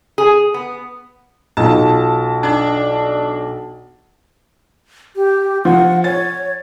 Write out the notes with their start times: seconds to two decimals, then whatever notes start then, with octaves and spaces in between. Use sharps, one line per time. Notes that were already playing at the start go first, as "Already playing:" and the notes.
0.18 G#4
0.54 B3
1.57 B1 F4 A5
2.43 D4 D5
5.16 G4
5.65 F3 F#5
6.04 C#5 A6